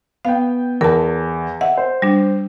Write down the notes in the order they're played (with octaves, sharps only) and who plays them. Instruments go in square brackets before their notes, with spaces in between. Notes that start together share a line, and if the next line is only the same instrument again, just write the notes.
[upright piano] B3 G5 [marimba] F5
[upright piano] E2 [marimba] A#4 A5
[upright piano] E5 [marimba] F#5
[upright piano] C5
[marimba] G3 D4